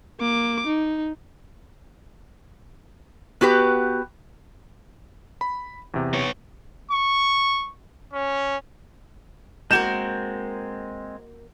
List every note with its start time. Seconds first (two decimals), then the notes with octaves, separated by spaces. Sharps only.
0.20 A#3 D6
0.67 D#4
3.41 B3 F#4 G4 B4
5.41 B5
5.94 E2 C3
6.14 B3 C#5
6.91 C#6
8.13 C#4
9.71 G#3 A#3 C4 F#4 A#4 G6 E7